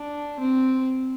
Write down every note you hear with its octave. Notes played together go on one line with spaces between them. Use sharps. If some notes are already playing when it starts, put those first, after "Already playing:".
Already playing: D4
C4